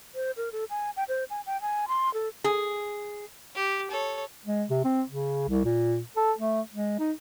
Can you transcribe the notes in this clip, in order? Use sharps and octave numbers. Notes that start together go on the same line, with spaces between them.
C5
A#4
A4
G#5
G5
C5
G#5
G5
G#5
C6
A4
G#4
G4
A4 C#5
G#3
C3
C4
C#3
C2
A#2
A4
A3
G#3
D#4